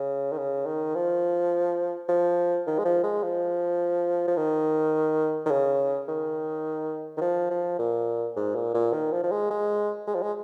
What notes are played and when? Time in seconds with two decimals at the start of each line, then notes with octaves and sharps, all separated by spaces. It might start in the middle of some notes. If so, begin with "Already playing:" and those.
Already playing: C#3
0.32 D#3
0.38 C#3
0.66 D#3
0.95 F3
2.08 F3
2.67 D#3
2.79 G#3
2.85 F3
3.03 G#3
3.23 F3
4.27 F3
4.37 D#3
5.46 D#3
5.51 C#3
6.08 D#3
7.17 D#3
7.21 F3
7.50 F3
7.79 A#2
8.36 G#2
8.55 A#2
8.74 A#2
8.93 D#3
9.12 F3
9.23 F3
9.31 G#3
9.50 G#3
10.07 G#3
10.15 F3
10.22 G#3